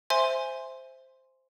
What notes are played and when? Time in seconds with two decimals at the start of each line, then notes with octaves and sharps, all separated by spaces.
0.10 C5 E5 G#5 C6